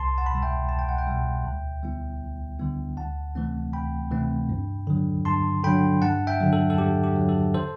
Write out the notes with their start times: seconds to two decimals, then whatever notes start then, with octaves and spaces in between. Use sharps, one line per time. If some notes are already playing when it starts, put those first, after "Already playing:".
Already playing: C2 A5 C6
0.18 F#5 A5
0.26 B5
0.30 B2 G3 A5
0.43 E5 G5
0.69 C2 A5
0.79 G5
0.89 F#5
0.98 E5 G5
1.07 B2 G3
1.45 D2
1.83 D3 G3 B3 E4
2.21 D2
2.59 D3 G3 B3 E4
2.97 D2 F#5 A5
3.35 C3 E3 A3 C4
3.73 D2 G5 B5
4.11 C3 E3 A3 C4
4.49 G2
4.87 D3 F#3
5.25 G2 A5 C6
5.64 D3 F#3 G5 B5
6.02 G2 F#5 A5
6.27 E5 G5
6.40 D3 F#3
6.53 A4
6.70 A4
6.78 G2 G4
7.03 G4
7.16 D3 F#3
7.29 A4
7.54 A4 C5